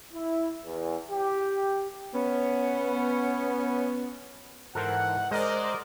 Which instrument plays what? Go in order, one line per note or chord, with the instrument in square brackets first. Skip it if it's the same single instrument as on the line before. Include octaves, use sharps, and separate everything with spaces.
[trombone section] E4
E2
G4
[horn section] B3 C#4
[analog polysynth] G#2 E3 [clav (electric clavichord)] A4 A#4 C5 [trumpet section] F#5
[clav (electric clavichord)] G#3 [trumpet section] A#4 D#5 [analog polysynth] C5 D5